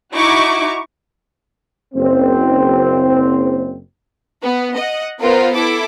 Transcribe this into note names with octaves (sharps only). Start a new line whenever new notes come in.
D#4 E4 F#4 C#6 D6
F#1 C4
B3
D#5 F#5
B3 F4 A#4 C5
E4 A4 D6